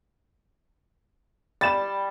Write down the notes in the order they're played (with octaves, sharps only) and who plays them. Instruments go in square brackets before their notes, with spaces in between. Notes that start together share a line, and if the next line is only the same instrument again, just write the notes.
[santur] G3 [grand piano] A6 E7